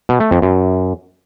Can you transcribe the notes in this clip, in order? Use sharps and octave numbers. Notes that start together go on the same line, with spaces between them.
B2
A3
F2
F#2